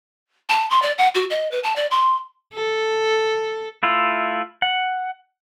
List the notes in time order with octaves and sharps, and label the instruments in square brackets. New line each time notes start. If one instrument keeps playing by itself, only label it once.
[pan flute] A5
C6
D5
F#5
F#4
D#5
B4
A5
D5
C6
[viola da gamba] A4
[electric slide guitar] A3 E4 F4
F#5